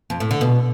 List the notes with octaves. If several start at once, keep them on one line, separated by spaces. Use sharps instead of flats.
F2
A2
D3
B2